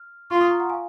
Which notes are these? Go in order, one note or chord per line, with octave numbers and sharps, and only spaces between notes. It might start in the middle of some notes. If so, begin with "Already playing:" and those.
Already playing: F6
F4 C#6 F6
C6 D#6
A#5 C#6
F#5 A#5
F5 G#5